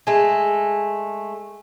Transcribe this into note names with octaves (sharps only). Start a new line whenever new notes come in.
G#3 A3